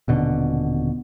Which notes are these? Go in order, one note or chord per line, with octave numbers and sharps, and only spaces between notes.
D#1 B2 D3